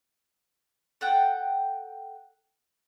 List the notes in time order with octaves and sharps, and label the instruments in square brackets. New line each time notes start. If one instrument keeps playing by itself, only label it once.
[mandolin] A4 F#5 G5